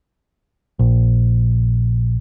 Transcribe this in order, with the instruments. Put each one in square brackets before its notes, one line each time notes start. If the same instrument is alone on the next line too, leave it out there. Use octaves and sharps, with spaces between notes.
[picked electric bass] A#1